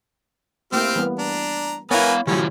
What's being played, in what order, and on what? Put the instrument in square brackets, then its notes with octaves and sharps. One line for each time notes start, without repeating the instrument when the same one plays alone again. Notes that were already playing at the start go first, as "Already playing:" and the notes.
[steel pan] A3 A#3 E4 [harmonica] C4 G4 F6
[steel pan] E3 G3 B3
[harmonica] D4 A#5
[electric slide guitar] B3 F5 [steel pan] E4 C#5 [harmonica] A#4 B4 G#5
[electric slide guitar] D#3 E4 F4 [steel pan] F#3 A3 G4 [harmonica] C#4